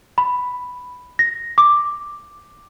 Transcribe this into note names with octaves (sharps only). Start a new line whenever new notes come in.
B5
A#6
D6